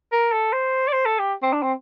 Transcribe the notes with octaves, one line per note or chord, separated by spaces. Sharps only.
A#4
A4
C5
D5
C5
A4
G4
C4
D4
C4